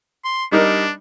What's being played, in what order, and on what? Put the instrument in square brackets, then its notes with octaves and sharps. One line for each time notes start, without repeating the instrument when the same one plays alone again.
[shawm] C6
[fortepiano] G3 D#4 A#4 [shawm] D4